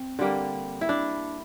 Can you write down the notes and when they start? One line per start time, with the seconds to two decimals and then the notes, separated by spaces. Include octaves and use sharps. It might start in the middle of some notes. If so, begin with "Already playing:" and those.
Already playing: C4
0.19 D3 G3 A#3
0.81 E4
0.89 D4